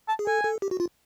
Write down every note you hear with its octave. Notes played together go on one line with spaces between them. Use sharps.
A5
G#4
A4 G#5
A4
G4
F#4
F4